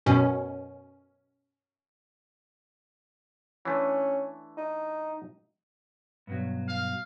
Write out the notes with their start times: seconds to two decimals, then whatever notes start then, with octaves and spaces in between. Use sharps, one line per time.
0.06 F#2 B2 C#4
3.65 E3 A3 C#4 D4
4.57 D#4
6.27 G2 B2 F#3
6.68 F5